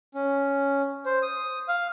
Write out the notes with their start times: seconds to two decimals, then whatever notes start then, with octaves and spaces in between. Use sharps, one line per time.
0.14 C#4
1.05 C5
1.23 D#6
1.68 F5